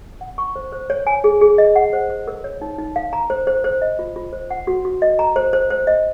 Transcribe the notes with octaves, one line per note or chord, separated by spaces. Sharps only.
F#5
C#6
C5
C5
C#5
G#5
G#4
G#4
D#5
F#5
C5
C5
A#4
C#5
D#4
D#4
F5
A#5
C5
C5
C5
D#5
F4
F4
C5
F#5
F#4
F#4
D#5
A#5
C5
C5
C5
D#5